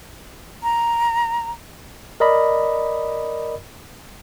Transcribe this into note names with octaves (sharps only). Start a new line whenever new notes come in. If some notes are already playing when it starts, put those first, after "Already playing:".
A#5
A#4 D5 D#5 B5